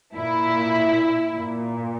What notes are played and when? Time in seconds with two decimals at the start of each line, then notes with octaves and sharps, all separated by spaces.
0.15 A#2 E4
1.33 A#2